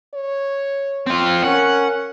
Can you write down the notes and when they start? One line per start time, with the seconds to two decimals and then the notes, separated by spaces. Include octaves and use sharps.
0.14 C#5
1.07 C4 F4
1.45 C#4 A#4 F#5